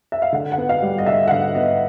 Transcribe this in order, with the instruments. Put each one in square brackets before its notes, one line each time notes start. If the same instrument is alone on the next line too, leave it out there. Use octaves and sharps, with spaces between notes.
[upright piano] E5
F5
D3 F#5
F#5
B3
F5
G3
D#5
D3 E5
F#5
D3 F5
B3 D#5